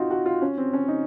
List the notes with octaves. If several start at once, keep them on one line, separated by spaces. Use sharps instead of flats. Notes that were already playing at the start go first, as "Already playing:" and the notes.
Already playing: C4 D#4 F4 F#4
F#4
F4
C#4
C4
C#4
D#4